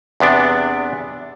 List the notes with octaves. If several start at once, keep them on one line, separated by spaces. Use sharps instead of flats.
E2 C3 B3 D4